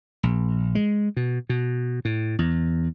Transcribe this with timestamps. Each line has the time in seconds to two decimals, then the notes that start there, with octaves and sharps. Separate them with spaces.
0.23 A#1
0.75 G#3
1.17 B2
1.49 B2
2.05 A2
2.39 E2